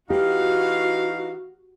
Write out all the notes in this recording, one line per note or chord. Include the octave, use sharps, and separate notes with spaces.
E3 D#4 F#4 G4 F5